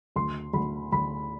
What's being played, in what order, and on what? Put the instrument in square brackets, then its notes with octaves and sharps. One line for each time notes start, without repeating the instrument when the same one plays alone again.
[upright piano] D2 C6
D2 B5
D2 B5